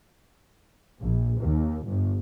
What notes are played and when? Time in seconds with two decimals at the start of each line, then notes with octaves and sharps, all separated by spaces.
0.99 A#1
1.39 D#2
1.86 G1